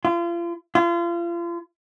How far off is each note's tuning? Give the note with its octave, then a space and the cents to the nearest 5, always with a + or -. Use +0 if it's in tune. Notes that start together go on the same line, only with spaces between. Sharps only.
F4 -35
F4 -35